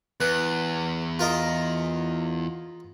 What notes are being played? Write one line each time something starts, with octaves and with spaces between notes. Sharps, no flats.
E2 B4
F4 A#4 D#5